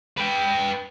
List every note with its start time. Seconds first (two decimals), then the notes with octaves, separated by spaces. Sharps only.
0.17 B4 G5